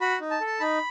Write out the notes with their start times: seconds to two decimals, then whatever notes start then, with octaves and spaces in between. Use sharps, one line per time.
0.01 F#4 B5
0.21 D#4
0.31 A5
0.41 A4
0.46 A5
0.60 D#4 B5